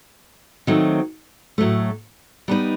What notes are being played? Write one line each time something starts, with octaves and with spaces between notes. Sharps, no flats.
D#3 F#3 A3 C4
A2 F#3 A3
G3 B3 D#4